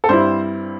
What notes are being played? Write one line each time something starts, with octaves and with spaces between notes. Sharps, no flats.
A4
G2 G3 C4 E4 C5